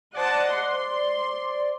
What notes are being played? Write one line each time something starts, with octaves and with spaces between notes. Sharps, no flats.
C5 D5 D#5 F#5 A5
C6